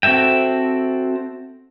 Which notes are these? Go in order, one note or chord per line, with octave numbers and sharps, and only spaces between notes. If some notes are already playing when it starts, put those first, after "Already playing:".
C4 F#4 A4 E5 G5